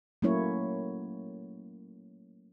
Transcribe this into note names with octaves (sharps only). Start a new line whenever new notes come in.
F#3 A3 A#3 C#4 E4 C#5